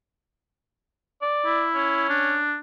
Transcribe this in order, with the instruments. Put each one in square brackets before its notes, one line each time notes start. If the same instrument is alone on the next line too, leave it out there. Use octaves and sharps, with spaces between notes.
[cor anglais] D5
[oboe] E4
[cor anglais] C#4
[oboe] D4